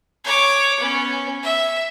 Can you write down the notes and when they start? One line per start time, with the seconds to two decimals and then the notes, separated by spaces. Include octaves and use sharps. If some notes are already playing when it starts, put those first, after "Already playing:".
0.24 C#5 D6
0.80 B3 C#4
1.43 E5